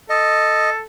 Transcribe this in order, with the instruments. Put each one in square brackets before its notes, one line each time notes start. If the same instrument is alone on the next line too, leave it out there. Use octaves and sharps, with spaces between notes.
[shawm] A4 [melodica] D#5